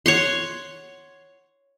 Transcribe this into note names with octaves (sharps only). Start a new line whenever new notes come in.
C#5 F#5 C6